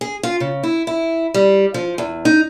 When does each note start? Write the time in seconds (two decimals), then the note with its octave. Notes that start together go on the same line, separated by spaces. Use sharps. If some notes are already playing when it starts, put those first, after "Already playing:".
0.01 G#4
0.23 F4
0.40 C#3
0.63 E4
0.87 E4
1.34 G3
1.74 F3
1.98 E2
2.25 D#4